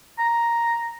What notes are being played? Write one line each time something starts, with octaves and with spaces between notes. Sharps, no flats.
A#5